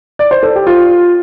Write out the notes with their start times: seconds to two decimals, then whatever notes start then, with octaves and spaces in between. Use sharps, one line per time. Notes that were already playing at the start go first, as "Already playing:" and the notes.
0.19 D5
0.31 C5
0.43 A4
0.56 G4
0.67 F4